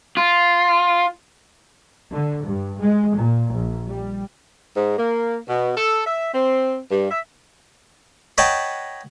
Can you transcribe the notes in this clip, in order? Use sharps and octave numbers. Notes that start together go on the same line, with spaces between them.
F4
D3
G2
G#3
A#2
A#1
G3
G#2
A#3
B2
A4
E5
C4
G2
E5
B4 C#5 D#5 F#5 G5 A5